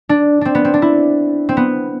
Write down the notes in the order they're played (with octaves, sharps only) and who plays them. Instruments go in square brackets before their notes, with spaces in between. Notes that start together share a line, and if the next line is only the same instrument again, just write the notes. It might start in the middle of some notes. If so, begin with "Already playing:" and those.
[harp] D4
C4 D4
B3
C4
D4
E4
C4
B3